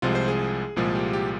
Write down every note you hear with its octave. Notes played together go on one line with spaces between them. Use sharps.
C2 C3 F3 G#3 F4
C5
G#4
C2 A#2 F3 G#3 G#4
G4
G4